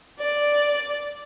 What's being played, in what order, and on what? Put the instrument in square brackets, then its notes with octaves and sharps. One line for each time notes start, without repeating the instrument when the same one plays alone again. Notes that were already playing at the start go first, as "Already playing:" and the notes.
[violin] D5